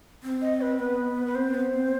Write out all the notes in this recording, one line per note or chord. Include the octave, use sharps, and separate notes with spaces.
C4
D#5
B4
B3 B4
B4
C4 C5
B3
C4